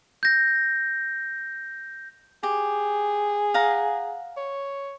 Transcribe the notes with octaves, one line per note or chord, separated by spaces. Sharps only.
G6 A#6
G4 G#4
F5 F#5 A#5
C#5